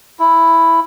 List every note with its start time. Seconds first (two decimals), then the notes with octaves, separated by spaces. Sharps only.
0.20 E4